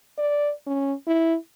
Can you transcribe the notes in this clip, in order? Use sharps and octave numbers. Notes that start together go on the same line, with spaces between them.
D5
C#4
E4